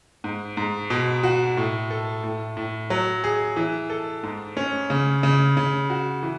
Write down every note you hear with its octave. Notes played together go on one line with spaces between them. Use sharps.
G#2
G#2
B2
F#4
A2
A4
A2
A2
F#3
G#4
E3
A4
G#2
C#4
C#3
C#3
C#3
F#4
E3